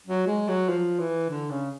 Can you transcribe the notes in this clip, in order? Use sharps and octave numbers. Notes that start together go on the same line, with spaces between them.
F#3
G#3
F#3
F3
E3
D3
C#3